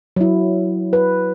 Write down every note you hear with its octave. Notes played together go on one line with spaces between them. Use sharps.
F#3 E4
B4